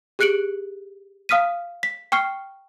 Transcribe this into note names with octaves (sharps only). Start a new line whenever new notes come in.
G4 G#4 F#6 C#7 D7 F#7
F5 D#6 F6 B6 D#7
B6
G5 C#6 F6 C7